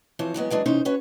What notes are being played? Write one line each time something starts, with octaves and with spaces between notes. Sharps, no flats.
E3 F3 C4 C5 C#5
E3 F#3 G#3 B3
E3 F#3 G#3 D4
C3 E3 C#4 D#4 C5
C#4 F#4 B4 C#5